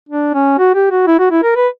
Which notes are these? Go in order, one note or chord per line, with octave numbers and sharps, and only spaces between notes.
D4
C#4
F#4
G4
F#4
E4
F#4
E4
A#4
B4